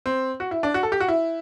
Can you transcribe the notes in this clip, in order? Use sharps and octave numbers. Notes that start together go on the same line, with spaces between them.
C4
F#4
E4
D4
F#4
A4
G4
F#4
E4